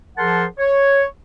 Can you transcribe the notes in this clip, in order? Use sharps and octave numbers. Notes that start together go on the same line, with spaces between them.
F3 G#4 A#4 F#5 A5 C6
C#5